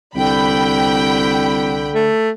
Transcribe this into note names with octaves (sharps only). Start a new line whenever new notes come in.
C2 D3 G5 B5
A3